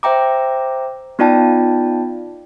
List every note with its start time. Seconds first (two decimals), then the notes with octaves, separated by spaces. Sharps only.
0.03 C5 E5 G5 A#5 D6
1.19 B3 D#4 F4 D5 G5 A5